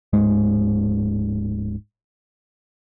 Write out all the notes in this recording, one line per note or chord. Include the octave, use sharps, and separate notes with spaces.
D1 G#2 G#3